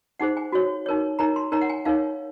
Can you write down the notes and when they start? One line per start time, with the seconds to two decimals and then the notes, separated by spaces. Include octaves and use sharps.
0.20 D#4 G#4 C5 F#5
0.37 G#5
0.52 F#4 C#5
0.86 D#4 A#4 C#5
1.19 D#4 A#4 C#5 A#5
1.36 C6
1.52 D#4 A#4 C#5 A#5
1.61 F#5
1.69 G#5
1.85 D#4 A#4 C#5 F5